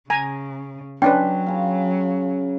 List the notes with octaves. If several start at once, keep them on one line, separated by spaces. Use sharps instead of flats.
C#3 G#5 A#5
F#3 C#4 D4 B4 G5 C6
C#3 F5